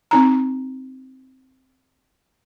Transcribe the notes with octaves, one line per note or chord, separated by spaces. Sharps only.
C4 D#4 A#5